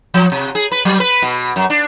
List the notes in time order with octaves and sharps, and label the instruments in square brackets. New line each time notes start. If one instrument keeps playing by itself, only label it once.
[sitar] F3
C3
G#4
B4
F#3
B4
B2
F#2
D4